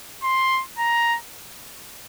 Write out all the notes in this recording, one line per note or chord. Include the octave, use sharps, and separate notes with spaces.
C6
A#5